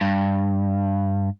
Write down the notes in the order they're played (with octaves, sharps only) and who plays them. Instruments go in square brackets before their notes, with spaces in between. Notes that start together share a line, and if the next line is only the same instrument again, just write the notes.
[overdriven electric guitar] G2